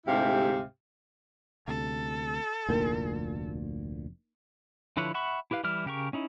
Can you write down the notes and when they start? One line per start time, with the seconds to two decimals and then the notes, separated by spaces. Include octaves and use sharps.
0.06 D2 G#2 C3 E4 G4 F5
1.68 D2 C3 A4
2.69 F1 D2 A#2 A#3 D#4 A#4
4.97 D3 F3 E4 B4 C#5
5.14 E5 F#5 B5 C#6
5.51 E4 G4 B4 F5
5.64 E3 G3 E4 F6
5.86 C#3 G4 A#4 C#6
6.13 C#4 D#4 E4